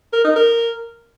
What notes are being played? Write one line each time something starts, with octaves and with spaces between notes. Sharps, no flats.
A#4
D#4
A#4